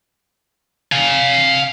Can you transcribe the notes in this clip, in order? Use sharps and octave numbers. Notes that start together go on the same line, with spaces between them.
F5 G#5